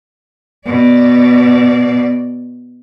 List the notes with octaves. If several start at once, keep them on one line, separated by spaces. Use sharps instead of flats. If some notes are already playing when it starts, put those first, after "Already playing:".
B2 D5